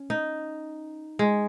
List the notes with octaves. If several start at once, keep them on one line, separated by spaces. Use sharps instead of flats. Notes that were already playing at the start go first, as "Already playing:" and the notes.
Already playing: C#4
D#4
G#3